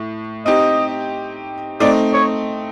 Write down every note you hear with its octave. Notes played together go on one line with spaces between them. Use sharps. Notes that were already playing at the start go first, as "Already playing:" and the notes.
Already playing: A2
C4 D#4 G4 D#5
A3 C4 D#4 D5
C#5